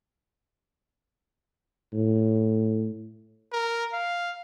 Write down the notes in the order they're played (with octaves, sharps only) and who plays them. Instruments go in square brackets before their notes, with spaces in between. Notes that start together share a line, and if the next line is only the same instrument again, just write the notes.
[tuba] A2
[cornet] A#4
F5